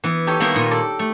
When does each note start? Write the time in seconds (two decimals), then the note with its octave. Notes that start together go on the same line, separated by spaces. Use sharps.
0.04 E3 B3
0.27 D#4 G4 A4 C#5
0.40 D#3 G3 A#3 B3 E4
0.55 A#2 D#4
0.71 A4 D5
0.99 A3